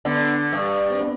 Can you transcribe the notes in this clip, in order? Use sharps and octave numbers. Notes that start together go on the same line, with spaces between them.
D3 B3 D4
G2
C4
B3 D4